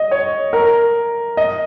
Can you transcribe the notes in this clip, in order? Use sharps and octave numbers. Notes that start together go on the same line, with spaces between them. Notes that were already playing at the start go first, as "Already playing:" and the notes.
Already playing: D#5
C#5
A#4
D#5